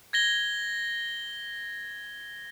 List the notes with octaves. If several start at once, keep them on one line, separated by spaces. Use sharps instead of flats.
G#6 A#6 G7